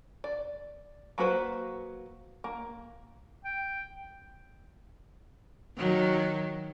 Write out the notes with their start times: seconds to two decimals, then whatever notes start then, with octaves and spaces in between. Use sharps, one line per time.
0.24 D5
1.18 F#3 A#3 F#4 B4 C5
2.44 A#3
3.45 G5
5.77 D#3 F#3